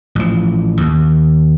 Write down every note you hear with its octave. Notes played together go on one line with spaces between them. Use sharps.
A1 F3
D#2